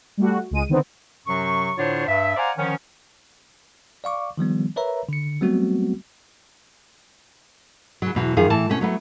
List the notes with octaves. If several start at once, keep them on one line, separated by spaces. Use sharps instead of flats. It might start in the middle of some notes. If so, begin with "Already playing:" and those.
G3 A3 F#4
C#2 G#3 D#7
D3 D#3 B3 C4
F#2 C3 F#3 C#6
A2 D3 D4 F4 C5 C#5
G2 E5
C5 D5 F5 F#5 G#5 A#5
D3 D#3 F3 C#4
D5 F5 C#6 D6
D#3 F3 G3 B3
A#4 B4 C#5 E5 A#5
D3 C#7
F#3 G3 A3 B3 C4 F#4
C#3 F#3
E2 B2 F#3
F#2 D#3 F3 G#4 F5
A2 E3 A5
B2 A3 C#4
F#3 A3 B3